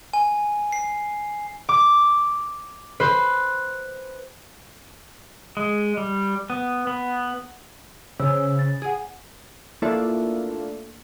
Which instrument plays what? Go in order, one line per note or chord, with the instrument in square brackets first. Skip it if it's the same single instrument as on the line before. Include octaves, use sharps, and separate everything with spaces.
[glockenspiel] G#5
C7
[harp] D6
B4 C5
[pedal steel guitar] G#3
G3
B3
B3
[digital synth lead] C#3 [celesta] C5 C#5 E6
[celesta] A6
[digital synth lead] G#4 [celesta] F#5 G#5
[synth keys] A3 A#3 D4 E4 F4 A4